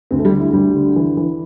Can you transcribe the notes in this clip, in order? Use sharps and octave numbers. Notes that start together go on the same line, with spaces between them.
D2 C4
A3
G3
D3
E4
D2 G3
D3
E3
E3